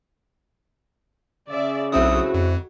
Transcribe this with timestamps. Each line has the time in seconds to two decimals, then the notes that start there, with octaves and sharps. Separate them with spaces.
1.49 C#3 D5 E5
1.92 B1 A3 C4 E4 F#4 D#6
2.34 F2